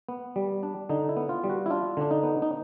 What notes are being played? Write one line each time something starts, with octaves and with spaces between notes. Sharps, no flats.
B3
G3
D4
D3 D#4
E4
B3
F4
G3
F#4
E4
D4 F4
D3 D4
D#4
B3
D#4